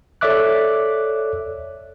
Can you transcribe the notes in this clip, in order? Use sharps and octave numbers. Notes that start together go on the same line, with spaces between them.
A4 C#5 D5 E5 D6 F#6